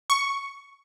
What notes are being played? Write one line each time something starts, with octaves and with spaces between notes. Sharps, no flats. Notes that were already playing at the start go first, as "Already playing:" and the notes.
C#6